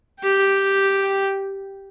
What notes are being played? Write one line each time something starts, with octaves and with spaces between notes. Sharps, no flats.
G4 G5